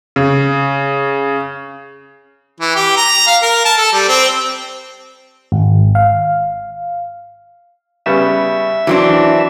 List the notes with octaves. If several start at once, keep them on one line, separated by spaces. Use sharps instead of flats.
C#3
E3
G4
A#5
F5
A#4
A5
A4
G3
C4
G#1
F5
C#3 G3 B3 E5
E3 F#3 C4 D4 E4